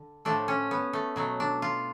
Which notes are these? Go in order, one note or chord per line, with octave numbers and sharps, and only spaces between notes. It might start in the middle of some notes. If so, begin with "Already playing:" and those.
Already playing: D3
A2 F3 A3 D4
C#4
B3
A3
B2 F#3 A3
D4
F4